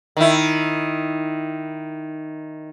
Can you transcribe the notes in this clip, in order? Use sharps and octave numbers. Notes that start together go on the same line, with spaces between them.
D#3 E4